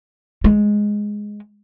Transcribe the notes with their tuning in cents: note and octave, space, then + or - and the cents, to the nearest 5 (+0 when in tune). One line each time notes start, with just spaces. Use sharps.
G#3 +0